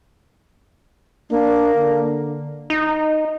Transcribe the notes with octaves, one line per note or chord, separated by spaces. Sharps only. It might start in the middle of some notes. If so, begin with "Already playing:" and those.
A#3 D4
D3
D#4